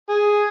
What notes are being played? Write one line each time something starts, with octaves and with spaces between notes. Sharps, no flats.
G#4